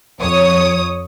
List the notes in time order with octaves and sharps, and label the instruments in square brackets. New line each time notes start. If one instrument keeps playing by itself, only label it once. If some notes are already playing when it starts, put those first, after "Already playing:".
[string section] F2 C#5 D#6